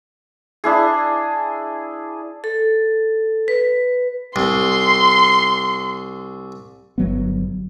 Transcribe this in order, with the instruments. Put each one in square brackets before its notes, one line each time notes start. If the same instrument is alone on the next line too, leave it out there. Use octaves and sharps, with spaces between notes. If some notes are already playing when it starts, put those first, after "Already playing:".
[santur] D4 E4 G#4
[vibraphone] A4
B4
[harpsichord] C2 [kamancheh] C6
[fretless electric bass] G1 F#3 B3